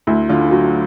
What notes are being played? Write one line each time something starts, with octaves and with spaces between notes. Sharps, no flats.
D2 E4
D3 F4
F#3 F#4